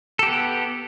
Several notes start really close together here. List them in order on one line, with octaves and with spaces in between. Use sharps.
A4 G4 B3